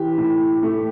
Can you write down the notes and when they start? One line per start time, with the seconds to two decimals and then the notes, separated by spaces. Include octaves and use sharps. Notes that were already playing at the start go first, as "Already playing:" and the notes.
Already playing: E3 G4
0.18 A2
0.63 A3